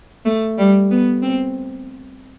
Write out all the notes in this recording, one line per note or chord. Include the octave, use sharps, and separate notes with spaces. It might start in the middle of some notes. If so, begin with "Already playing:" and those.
A3
G3
B3
C4